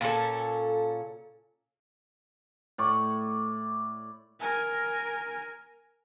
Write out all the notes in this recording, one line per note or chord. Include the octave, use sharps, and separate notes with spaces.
A#2 C#4 F4 A4
A2 D5 C#6
A#4 G#5